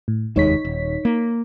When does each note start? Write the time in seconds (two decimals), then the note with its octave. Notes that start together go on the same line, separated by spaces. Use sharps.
0.08 A2
0.36 F1 D#2 G#3 D#4 C#5 B6
0.65 D#1
1.05 A#3